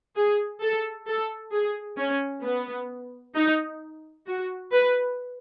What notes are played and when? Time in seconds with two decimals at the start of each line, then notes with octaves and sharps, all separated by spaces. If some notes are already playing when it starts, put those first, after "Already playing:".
0.16 G#4
0.62 A4
1.08 A4
1.52 G#4
1.98 C#4
2.44 B3
3.35 D#4
4.27 F#4
4.72 B4